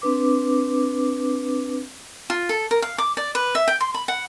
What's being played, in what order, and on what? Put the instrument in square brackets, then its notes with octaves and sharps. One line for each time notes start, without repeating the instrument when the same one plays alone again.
[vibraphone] C4 D4 B4 D6
[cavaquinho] F4
A4
A#4
F5
D6
D5
B4
E5
G5
C6
B5
F#5